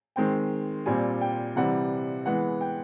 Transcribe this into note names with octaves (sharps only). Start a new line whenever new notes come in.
D#3 G#3 C4 G5
A#2 G3 C4 G#5
G5
C3 E3 G3 C4 F#5
E3 G#3 B3 F#5
G5